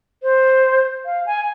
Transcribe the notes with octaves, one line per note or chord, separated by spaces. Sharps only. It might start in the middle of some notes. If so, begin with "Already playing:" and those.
C5
F5
G#5